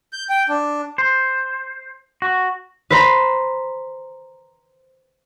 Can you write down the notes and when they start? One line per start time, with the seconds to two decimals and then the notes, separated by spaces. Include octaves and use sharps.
0.13 G6
0.29 G5
0.49 D4
0.98 C5
2.22 F#4
2.90 B4 C5 A#5